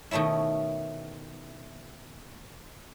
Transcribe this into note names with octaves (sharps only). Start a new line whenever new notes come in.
B2 D#3 A3 C#4 E4